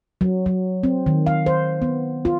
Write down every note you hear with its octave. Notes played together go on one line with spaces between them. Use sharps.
F#3
F#3
C4
D#3
F5
C5
B3
F4